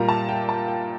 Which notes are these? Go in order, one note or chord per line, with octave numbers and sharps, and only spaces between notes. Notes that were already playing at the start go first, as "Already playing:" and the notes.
Already playing: A#2 G3 A#3 A#5
A5
G5
A5
G5